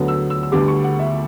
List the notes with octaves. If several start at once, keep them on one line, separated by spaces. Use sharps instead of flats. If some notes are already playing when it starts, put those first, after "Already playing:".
Already playing: D2 D3 F#3 B3
E6
E6
E6
D2 D3 G3 B3 D6
C#6
F#5
E5